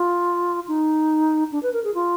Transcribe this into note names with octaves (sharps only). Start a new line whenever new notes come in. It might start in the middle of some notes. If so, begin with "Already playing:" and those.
Already playing: F4
D#4
D4
B4
A#4
G#4
F4